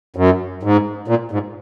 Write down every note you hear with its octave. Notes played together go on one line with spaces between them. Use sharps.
F#2
G#2
A#2
G#2